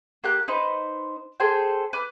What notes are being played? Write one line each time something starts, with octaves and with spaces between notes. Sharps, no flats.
A#3 G4 F#6
D#4 B4 C5
G#4 A4 C5 G5
B4 D6 F6